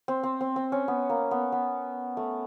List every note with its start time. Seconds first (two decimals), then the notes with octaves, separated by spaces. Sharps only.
0.08 C4
0.23 C4
0.41 C4
0.56 C4
0.72 C#4
0.88 B3
1.10 A#3
1.31 B3
1.52 B3
2.17 A3